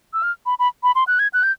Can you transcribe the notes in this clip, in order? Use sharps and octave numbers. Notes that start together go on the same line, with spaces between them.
E6
F6
B5
B5
B5
C6
F#6
G#6
F#6
G6